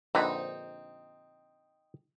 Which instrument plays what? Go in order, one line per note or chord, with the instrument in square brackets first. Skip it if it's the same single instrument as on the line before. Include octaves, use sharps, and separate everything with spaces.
[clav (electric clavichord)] A#1 D3 B4 [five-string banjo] C4 D#4